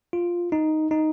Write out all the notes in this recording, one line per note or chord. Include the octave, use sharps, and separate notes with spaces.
F4
D#4
D#4